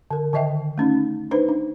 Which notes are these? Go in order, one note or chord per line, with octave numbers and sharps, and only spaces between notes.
D3 A#4
D3 D#3 D#5 E5 G5
A3 C#4 D#4
D4 D#4 B4 C5
D4